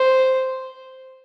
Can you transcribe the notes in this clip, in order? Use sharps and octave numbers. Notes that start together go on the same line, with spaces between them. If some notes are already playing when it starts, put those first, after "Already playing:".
Already playing: C5